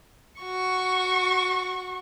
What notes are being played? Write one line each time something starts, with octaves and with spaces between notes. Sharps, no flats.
F#4 C#6